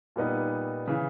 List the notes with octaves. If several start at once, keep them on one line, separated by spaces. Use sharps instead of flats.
A#2 G3 B3 D#4
C#3 E3